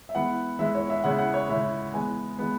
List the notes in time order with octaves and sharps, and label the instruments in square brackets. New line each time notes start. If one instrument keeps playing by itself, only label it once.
[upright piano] E5
E3 G#3 B3 E4 F#5
E3 G#3 B3 E4 E5
C#5
E5
C#3 G#3 E4 F#5
F#5
C#5
C#3 G#3 E4 E5
E3 G#3 B3 G#5
E3 G#3 B3